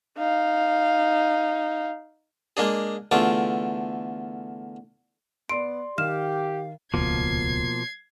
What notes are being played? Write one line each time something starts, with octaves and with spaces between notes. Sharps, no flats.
D#4 F5
G#3 A#3 D4 G#4
E2 D3 A3 F4 D6
B3 D5 C6 D7
D#3 G4 F5 F6 E7
D#1 C#2 B2 F3 A#3 G#6 C7